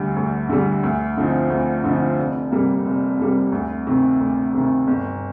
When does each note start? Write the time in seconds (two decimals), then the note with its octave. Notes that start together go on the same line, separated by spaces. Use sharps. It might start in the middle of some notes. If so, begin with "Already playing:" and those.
Already playing: D2 D3 G3
0.16 D2
0.49 D3 G3
0.83 D2
1.17 D3 F3 C4 D#4
1.50 D2
1.84 D3 F3 C4 D#4
2.18 F1
2.51 F2 C3 G3 A#3
2.85 F1
3.19 F2 C3 G3 A#3
3.52 D2
3.87 C3 D#3
4.21 D2
4.54 C3 D#3
4.87 G1